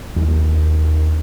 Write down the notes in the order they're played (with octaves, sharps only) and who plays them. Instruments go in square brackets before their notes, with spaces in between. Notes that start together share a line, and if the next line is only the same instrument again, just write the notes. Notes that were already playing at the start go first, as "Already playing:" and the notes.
[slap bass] D#2